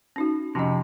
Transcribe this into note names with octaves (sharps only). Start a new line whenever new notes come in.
C#4 D#4 F#4
F2 C3 C#4 D#5